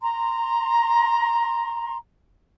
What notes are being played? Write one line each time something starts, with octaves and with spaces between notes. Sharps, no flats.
A#5 C6